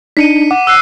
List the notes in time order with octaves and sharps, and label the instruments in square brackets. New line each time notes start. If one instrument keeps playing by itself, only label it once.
[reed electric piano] D4 D#4 [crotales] B6 C#7 D#7
[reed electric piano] F#5 [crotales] D6
[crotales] E6 F#6 C7